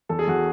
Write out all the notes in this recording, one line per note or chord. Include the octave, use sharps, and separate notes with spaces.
E2 A4
G#4
E2 F#4